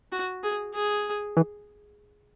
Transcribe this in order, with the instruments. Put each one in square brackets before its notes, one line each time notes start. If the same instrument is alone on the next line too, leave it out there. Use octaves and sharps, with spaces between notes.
[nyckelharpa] F#4
G#4
G#4
[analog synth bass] E3